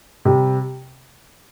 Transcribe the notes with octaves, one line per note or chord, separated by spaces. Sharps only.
C3 G3